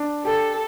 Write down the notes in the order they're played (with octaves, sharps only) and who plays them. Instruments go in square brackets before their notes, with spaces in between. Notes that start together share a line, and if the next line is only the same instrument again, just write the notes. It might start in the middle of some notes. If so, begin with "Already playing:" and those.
Already playing: [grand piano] D4
[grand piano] G4 [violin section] A4